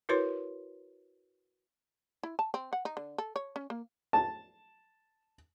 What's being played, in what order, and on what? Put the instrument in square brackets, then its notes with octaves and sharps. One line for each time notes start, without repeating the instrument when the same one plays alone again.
[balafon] E4 F#4 A#4 B4 C#5 C6
[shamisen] E4
A5
C4
F#5
D#4
D3
A4
C#5
C#4
A#3
[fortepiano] A5